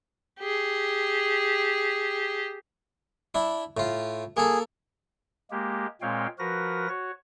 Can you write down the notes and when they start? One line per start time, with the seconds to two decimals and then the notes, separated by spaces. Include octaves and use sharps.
0.39 G4 G#4
3.35 D4 E4
3.77 A2 F4
4.37 A#3 G#4 A4
5.51 G#3 A#3 G4
6.01 A#2 G#3 C4 C#5 F5 G5
6.39 F3 F#4 A#4 B4 A#6
6.88 F#4 C#5